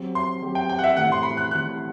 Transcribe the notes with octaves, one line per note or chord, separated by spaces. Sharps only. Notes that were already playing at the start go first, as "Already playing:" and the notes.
Already playing: F#3 C4 G4
C6
F#3 C4 G4
G5
G5
F#5
E5
A2 E3 G3 C4 F#5
C6
B5
F#6
A2 E3 G3 C4 F#6